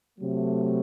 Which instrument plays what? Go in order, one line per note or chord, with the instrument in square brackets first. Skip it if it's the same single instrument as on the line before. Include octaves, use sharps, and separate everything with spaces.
[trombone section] C3 F#3 A3